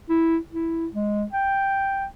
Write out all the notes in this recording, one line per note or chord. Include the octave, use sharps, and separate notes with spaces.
E4
E4
G#3
G5